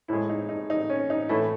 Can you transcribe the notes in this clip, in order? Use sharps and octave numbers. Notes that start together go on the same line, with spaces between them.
A2 G#3 E4
D#4
D#4
D#4
C#4
D#4
A2 E3 A3 E4